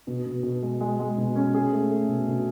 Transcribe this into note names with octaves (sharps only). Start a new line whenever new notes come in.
B2
B2
B2
G#3
G#3
G#3
B2
C#4
G#4
A3
A3
B2
B2